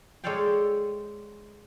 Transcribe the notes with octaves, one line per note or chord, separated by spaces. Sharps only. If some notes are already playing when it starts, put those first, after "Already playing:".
G#3 A4 C#5 D5 F5 G5